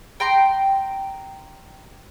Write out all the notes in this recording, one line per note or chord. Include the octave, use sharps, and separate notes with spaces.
G5 A#5 C6